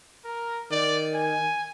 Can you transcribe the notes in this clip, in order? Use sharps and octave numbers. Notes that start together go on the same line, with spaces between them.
A#4
D#3 D5
G#5